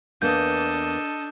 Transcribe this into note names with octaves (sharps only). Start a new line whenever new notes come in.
E2 A#3 B3 D4 A4 D#5 G6